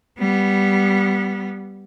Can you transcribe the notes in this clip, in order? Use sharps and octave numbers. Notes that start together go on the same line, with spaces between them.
G3 B3